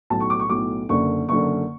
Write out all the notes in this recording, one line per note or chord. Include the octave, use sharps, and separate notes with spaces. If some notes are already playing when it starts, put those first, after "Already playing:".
B1 A2 F#3 A5
C#6
D6
C#6
B1 A2 F#3 D6
F#1 F#2 D3 C#6
F#1 F#2 D3 C#6